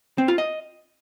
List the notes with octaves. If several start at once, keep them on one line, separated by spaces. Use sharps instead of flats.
C4
F4
D#5